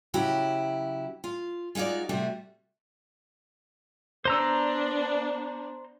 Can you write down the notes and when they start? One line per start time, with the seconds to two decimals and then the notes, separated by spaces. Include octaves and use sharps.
0.14 C#3 F#3 E4 F#4 G4
1.24 F4
1.75 G#3 D#4 F4 F#4 D5
2.09 C3 G3 A3 F#4
4.25 B3 D4 C5 A#5 E6